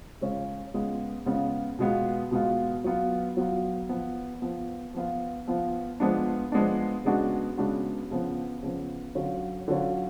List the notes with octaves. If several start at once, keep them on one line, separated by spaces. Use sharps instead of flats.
C#3 G#3 C#4 F4
C#3 G#3 B3 F4
C#3 G#3 B3 F4
B2 G#3 B3 F4
B2 G#3 B3 F4
F#3 B3 F4
F#3 B3 F4
F3 B3 F4
F3 B3 F4
F3 B3 F4
F3 B3 F4
F3 G#3 B3 D4
F3 G#3 B3 D4
C#3 G#3 B3 D4 F#4
C#3 G#3 B3 D4 F#4
C#3 F3 B3
C#3 F3 B3
D3 F#3 C#4 F4
D3 F#3 C#4 F4